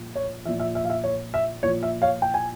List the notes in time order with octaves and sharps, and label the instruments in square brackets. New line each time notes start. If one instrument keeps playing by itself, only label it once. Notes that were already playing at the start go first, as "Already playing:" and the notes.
Already playing: [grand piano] A#2 F3
C#5
A#2 F3 E5
E5
E5
F5
E5
C#5
E5
A#2 F3 C#5
E5
C#5 F5
G5
G#5